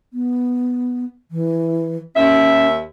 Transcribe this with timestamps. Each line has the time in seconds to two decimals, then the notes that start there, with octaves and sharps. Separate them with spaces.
0.13 B3
1.31 E3
2.16 D#2 C#4 E5